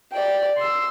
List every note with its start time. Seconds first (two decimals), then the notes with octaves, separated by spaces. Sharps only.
0.12 D5 G5
0.58 C6 E6